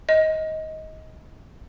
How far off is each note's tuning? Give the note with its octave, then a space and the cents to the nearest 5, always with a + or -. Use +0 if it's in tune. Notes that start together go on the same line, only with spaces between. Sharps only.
D#5 +15